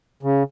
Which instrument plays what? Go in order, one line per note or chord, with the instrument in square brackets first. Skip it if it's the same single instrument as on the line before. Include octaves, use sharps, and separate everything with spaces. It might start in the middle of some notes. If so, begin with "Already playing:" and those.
[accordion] C#3